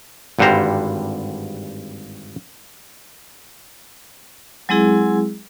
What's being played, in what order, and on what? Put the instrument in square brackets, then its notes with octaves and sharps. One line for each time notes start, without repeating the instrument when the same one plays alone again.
[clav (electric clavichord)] G#1 G2 D3 G3 C5 A#5
[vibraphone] F#3 G#3 C4 E4 G#4